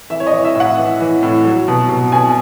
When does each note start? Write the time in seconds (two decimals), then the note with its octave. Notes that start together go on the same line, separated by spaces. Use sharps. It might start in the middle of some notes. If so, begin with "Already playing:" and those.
0.10 E3 E5
0.20 C#5
0.27 D#5
0.32 E3
0.44 E5
0.55 A2 F#5
0.77 E3
1.00 E3
1.23 A2
1.45 F#3
1.68 B2
1.89 B2
2.12 B2 G#5